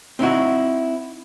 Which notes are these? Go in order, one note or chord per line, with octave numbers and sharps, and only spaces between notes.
C4 D#4 E4 F#4